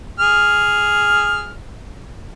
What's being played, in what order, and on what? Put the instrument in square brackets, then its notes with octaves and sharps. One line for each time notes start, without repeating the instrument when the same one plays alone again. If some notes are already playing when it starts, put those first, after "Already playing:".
[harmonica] G#4 F6